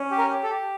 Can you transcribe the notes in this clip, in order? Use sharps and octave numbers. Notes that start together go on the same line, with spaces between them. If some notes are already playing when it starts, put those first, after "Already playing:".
Already playing: C#4
G4
A#4
G4
A4
G4